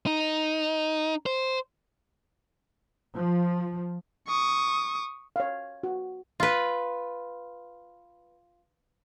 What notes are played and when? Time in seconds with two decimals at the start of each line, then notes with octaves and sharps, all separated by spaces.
0.06 D#4
1.26 C5
3.15 F3
4.28 C#6 D#6
5.36 C#5 F5
5.83 F#4
6.40 F4 B4